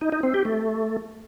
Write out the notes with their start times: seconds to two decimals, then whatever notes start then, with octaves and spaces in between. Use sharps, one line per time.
0.01 D#4
0.12 D#4
0.23 C4
0.34 G4
0.45 A3